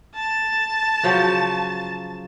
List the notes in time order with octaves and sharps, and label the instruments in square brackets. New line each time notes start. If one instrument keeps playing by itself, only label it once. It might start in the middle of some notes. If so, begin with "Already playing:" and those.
[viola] A5
[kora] C#3 F3 F#3